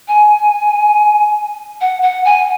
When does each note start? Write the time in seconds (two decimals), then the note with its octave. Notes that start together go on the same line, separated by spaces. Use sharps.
0.08 G#5
1.81 F#5
2.02 F#5
2.25 G#5